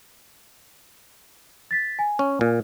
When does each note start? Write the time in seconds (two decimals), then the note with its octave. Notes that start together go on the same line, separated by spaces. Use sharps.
1.71 A6 B6
1.99 G#5
2.19 C#4
2.41 A#2